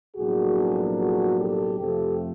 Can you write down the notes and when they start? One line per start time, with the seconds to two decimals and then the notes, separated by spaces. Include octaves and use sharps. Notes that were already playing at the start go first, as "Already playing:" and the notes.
0.15 B1 A2 F3 A#3 D4 F#4 G#4
0.97 F#4 G#4
1.39 G4 A4
1.79 F2 C3 F3 A3 C4 G4 A4